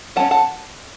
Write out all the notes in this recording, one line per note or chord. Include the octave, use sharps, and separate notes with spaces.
F#3 C#4 F#5 A5
F#5 A5